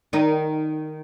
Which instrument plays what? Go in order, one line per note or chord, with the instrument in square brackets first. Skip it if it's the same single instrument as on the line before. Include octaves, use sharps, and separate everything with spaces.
[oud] D#3 D#4